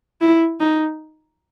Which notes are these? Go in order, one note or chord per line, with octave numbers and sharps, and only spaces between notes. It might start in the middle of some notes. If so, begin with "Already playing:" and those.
E4
D#4